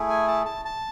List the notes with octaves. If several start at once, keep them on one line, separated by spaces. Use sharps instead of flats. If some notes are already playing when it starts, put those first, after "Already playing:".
Already playing: A3 E4 G#4
G#5
A5
A5
A5